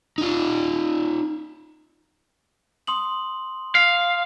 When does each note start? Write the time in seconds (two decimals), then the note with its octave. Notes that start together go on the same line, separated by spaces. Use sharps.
0.18 D#4 F4
2.87 C6 D#6 F#7
3.75 F5 F6